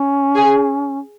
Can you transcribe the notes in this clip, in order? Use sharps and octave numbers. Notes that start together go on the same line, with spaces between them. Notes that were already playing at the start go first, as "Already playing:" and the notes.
Already playing: C#4
G#4